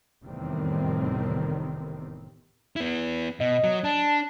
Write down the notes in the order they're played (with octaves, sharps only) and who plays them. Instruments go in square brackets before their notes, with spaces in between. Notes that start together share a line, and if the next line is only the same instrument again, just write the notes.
[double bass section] F1 E2 A2 D#3 G3 C4
[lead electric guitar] B3 E4
[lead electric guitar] B2 [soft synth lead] D#5
[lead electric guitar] F#3
[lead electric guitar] D4 [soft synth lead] A5